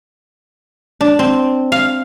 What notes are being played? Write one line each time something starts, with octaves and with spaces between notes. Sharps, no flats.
D4
C4
F5